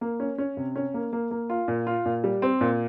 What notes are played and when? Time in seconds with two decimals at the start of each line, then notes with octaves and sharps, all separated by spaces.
0.01 A#3
0.20 C#4
0.38 C#4
0.57 C3
0.76 C#4
0.94 A#3
1.13 A#3
1.31 A#3
1.50 F4
1.68 A#2
1.87 F4
2.05 A#2
2.24 G3
2.42 C4
2.61 A#2